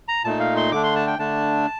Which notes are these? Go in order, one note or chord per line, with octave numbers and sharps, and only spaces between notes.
A#5
A#2 A3 D#4 A5
F5
C6
D3 A3 D4 D6
C6
A5
G5
D3 A3 D4 A5